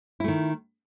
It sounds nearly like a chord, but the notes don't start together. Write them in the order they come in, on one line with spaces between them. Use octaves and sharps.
E4 A3 D#3